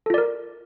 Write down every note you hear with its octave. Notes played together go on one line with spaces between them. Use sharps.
F4 A4 A#4 D5